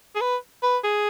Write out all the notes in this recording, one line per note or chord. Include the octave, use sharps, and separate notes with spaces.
G#4
B4
B4
G#4